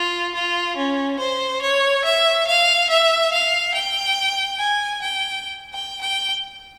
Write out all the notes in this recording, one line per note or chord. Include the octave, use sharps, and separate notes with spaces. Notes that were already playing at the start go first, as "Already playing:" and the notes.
Already playing: F4
F4
C#4
C5
C#5
E5
F5
E5
F5
G5
G#5
G5
G5
G5